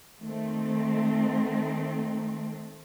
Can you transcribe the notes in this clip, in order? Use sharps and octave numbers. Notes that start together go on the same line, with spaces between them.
D#3 A3 C4